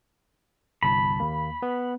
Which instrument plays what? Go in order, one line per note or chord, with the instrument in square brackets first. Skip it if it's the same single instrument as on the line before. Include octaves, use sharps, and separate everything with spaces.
[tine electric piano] G1 C2 A5 [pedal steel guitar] B5
[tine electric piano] D#2 A#3
B3